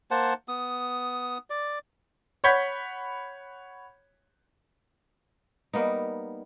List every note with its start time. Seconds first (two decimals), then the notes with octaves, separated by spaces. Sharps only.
0.11 A#3 C5 F#5 A5
0.48 B3 D#6
1.50 D5
2.44 C#5 F#5 B5 G6 G#6 B6
5.73 G3 A#3 B3 D#4